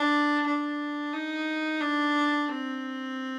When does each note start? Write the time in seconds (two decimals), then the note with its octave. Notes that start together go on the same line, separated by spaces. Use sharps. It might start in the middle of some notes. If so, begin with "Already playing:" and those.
Already playing: D4
0.46 D4
1.13 D#4
1.81 D4
2.49 C4